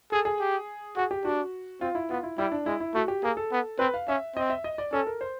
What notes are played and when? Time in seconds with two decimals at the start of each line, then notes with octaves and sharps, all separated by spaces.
0.12 G#4 A4
0.25 G#4
0.39 G4
0.96 F#4 G#4
1.11 G4
1.25 D4 F#4
1.81 C4 F4
1.95 E4
2.10 B3 F4
2.23 E4
2.38 G3 E4
2.52 D4
2.66 G#3 E4
2.80 E4
2.95 A3 F#4
3.08 G4
3.23 A#3 G#4
3.37 A4
3.52 B3
3.79 C4 B4
3.94 F5
4.08 C#4 E5
4.36 C4 D#5
4.50 E5
4.64 D#5
4.78 D5
4.92 C#4 A4
5.07 A#4
5.21 C5